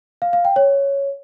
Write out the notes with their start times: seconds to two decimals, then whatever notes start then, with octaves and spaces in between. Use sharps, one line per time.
0.22 F5
0.33 F5
0.45 G5
0.56 C#5